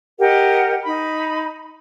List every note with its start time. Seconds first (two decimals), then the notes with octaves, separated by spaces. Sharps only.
0.20 G4 A#4 D#5 F#5
0.84 D#4 B5